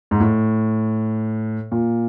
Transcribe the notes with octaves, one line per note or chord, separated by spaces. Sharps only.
G#2
A2
A#2